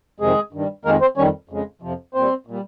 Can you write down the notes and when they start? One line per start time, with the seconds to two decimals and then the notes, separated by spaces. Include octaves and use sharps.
0.20 F2 C3 D#3 G#3 G#4
0.53 G2 D#3 G3
0.85 F2 D#3 G#3 A#3 A#4
1.01 C4 C5
1.17 F2 D#3 G3 C#4 C#5
1.49 F2 C#3 G#3
1.82 F2 C3 F3
2.14 A#2 G3 C4 C5
2.47 A#2 G3